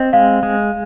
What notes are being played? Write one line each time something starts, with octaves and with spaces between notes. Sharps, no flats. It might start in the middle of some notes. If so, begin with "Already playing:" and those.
Already playing: C4 D#5
G#3 F5
G#3